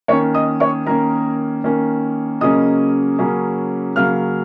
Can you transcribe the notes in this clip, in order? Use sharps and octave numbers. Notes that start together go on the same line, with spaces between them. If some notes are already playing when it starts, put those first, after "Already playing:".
D#3 A#3 C#4 C#5 C#6
D#5 D#6
C#5 C#6
D#3 A#3 C#4 A#4 A#5
D#3 A#3 C#4
C#3 F#3 A#3 C#4 D#5 D#6
C#3 F#3 A#3 C#4
C#3 F#3 A#3 C#4 F5 F6